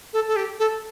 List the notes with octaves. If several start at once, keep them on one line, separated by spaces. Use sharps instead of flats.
A4
A4
G4
A4